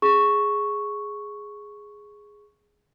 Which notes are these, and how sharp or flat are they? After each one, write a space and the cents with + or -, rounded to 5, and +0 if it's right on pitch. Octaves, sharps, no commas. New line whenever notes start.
G#4 +0 C#6 +0